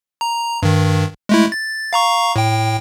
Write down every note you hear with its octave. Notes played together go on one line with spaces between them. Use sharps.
A#5
G2 D#3
G#3 A3 E4
A6
F5 A#5 C#6
A2 G5